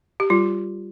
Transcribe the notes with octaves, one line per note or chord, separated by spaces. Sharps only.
G4
G3 F4